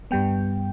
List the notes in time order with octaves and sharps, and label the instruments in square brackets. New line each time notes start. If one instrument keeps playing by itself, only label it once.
[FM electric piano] G2 G3 B3 G5